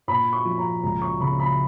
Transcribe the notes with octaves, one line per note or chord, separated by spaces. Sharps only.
A#2 B5
C#6
F3
A#5
C#2 A#5
C#6
C#3 B5
B5